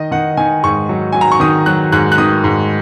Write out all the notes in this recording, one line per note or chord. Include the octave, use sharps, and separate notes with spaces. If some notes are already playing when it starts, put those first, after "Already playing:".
Already playing: D#3 D#5
D#3 F#5
D#3 G#5
G#2 C#6
F#3
F#3 G#5
A#5
C#6
D#3 D#6
F#3 F#6
G#2 F#6
F#6
D#3 D#6
G#2